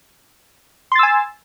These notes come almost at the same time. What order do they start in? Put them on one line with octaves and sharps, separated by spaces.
C6 A6 E6 G#5